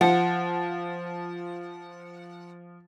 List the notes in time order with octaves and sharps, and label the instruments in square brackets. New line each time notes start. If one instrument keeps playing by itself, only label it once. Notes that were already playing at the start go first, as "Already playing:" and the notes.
[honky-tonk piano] F3 [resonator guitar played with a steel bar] F#5